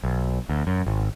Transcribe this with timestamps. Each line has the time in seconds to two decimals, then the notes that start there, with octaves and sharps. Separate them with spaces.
0.04 B1
0.50 D2
0.67 F#2
0.87 G#1